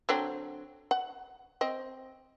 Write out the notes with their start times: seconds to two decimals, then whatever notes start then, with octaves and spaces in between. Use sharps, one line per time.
0.09 D3 F#3 C4
0.91 F#5
1.61 C4 D#5